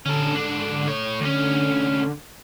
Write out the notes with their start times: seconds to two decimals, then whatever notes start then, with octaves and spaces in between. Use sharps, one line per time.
0.06 D3 C#4 A4
0.35 G#2 D4
0.88 A3 C#5
1.21 D2 D3 C#4